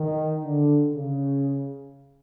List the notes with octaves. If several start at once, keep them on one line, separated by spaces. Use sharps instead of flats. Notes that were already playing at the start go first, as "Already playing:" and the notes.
Already playing: D#3
D3
C#3